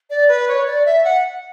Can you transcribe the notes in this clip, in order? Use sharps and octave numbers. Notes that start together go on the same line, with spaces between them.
D5
B4
C#5
D5
E5
F#5